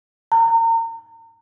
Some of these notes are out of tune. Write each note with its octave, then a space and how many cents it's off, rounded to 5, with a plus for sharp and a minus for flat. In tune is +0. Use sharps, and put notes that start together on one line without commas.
A#5 -35